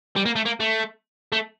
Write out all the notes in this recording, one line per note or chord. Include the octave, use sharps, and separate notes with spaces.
G3
A#3
A3
A#3
A3
A3